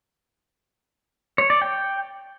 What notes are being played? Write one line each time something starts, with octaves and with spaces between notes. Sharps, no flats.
C#5
D5
G5